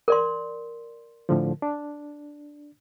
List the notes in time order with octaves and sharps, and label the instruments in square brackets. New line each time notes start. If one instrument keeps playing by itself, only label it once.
[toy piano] A#4 D5 C6
[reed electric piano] A2 D3 F3
D4